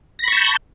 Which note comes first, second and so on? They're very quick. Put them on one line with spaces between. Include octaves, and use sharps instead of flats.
A#6 B5 C#6 A5 G6